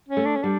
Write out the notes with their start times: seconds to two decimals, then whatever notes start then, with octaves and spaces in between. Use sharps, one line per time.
0.08 C#4
0.17 A3
0.25 D4
0.35 C#4
0.43 G3 D4